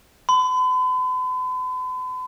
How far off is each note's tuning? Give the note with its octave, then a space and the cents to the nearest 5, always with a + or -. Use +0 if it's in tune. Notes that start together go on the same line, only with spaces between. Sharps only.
B5 +45